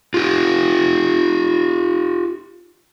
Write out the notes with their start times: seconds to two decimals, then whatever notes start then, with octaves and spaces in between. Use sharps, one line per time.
0.14 F4 G4